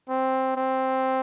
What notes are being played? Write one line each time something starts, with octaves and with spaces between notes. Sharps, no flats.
C4
C4